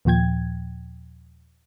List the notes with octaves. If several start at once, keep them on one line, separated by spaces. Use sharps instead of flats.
D#2 A#2 F3 G5 G#6